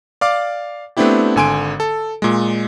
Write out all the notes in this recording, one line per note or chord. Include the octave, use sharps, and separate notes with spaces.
D5 F5 D6
A3 B3 C4 D4 E4 G4
G#1 D3 G#5 C6 D7
A4
A#2 G#3